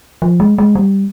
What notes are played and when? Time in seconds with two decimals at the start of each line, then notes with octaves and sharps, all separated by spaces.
0.22 F3
0.40 G#3
0.58 G#3
0.75 G3